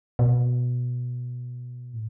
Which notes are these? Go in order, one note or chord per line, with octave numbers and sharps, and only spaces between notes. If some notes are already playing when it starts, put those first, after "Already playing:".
B2
A2